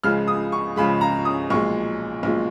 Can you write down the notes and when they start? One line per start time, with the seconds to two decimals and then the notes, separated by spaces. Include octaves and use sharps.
0.03 C#2 C#3 F3 G#3 F6
0.28 D#6
0.52 C#6
0.76 C#2 C#3 F3 G#3 B5
1.01 A#5
1.25 D#6
1.50 B1 A#2 F3 G#3 C#6
2.23 B1 A#2 F3 G#3